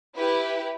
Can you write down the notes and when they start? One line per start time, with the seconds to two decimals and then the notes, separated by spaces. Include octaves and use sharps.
0.16 E4 G4 B4